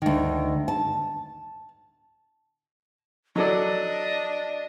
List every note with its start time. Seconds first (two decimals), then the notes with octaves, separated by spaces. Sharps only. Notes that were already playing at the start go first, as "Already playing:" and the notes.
0.02 D2 D#3
0.68 A5
3.36 F#3 D4 A4 D5 D#5